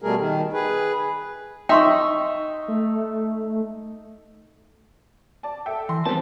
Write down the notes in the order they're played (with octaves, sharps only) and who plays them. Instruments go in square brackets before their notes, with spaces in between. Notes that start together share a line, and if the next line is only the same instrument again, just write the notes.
[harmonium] B2 G3 A3 G#4 A#4
D#3
G#4 B4
[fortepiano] D#4 E5 [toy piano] G5 C6 C#6
[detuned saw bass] A3
[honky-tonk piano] D5 A5
A4 E5 G5
[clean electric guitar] E3 [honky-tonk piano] C6
[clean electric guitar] G3 A5 [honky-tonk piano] B3 C4